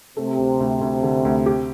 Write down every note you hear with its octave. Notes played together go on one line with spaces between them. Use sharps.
C3 A3
D2
D2
D2
D3
D2
G4